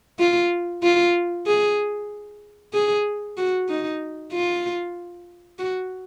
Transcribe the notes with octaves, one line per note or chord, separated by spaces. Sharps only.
F4
F4
G#4
G#4
F#4
D#4
F4
F#4